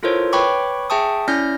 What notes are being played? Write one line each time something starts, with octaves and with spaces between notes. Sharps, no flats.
E4 F4 A4 A#4 C5 C#5
B4 C#5 G5 B5 C#6 D6
G#4 E5 G5 A5 C#6 D#6
C#4 E4 D5 F6 G6 A#6